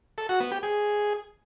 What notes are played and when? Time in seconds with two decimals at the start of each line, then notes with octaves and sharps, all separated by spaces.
0.18 A4
0.29 F#4
0.40 B3
0.52 G4
0.63 G#4